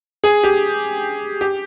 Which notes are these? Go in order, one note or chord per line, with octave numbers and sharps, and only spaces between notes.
G#4
G4
G4